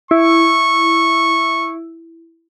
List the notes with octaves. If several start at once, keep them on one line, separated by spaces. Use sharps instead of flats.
E4 C#6